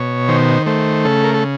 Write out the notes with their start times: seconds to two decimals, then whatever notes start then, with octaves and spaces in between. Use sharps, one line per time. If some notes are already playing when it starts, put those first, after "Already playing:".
Already playing: B2 C#5
0.29 D#3 C5
0.66 A3 C5
1.05 C#3 A4
1.24 A#4
1.34 A4